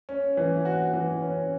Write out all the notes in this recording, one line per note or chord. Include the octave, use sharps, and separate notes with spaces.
C#4
E3
F#4
E3
C#4